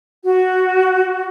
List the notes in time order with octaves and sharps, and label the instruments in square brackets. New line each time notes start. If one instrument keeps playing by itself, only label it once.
[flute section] F#4